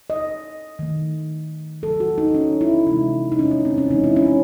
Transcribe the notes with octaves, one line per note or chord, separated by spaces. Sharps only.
D#5
D#3 A3
C#3 F#3 A3 A4
F#4
D#4
C#4
E4
C3 E3 G#3 D#4
D#4
C#4
C#4
C4
C#4
C#3 E3 G#3 D#4
E4
C#4